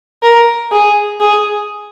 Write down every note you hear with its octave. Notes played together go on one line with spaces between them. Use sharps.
A#4
G#4
G#4